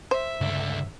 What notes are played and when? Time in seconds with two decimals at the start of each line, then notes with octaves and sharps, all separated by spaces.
0.11 C5 E5
0.41 C#2 G2 D3